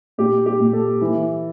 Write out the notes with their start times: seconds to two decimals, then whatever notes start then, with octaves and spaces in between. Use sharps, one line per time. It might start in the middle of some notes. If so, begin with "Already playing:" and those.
0.18 A#2 G4
0.46 G4
0.60 A#2
0.73 A4
1.01 E3